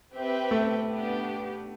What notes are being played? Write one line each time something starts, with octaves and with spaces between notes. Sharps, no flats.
C4 G4 B4 E5 G5
A3
B3 D4 G4